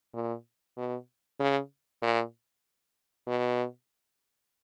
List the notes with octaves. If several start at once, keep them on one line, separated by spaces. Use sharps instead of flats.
A#2
B2
C#3
A#2
B2